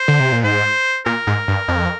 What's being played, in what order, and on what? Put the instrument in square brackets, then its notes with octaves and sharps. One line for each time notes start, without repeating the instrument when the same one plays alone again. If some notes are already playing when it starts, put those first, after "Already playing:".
Already playing: [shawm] C5
[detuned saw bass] D3
C3
A#2
[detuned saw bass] G#2 [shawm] C5
[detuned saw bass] A#2 [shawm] A#4
[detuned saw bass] G#2
G2
F2